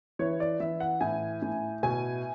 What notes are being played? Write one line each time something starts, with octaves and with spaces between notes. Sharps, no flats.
E3 C#5
D5
E3 E5
F#5
A2 G#5
A2
B2 G#5